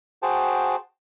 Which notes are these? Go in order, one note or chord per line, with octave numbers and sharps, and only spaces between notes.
F#4 G#4 C5 G5 A5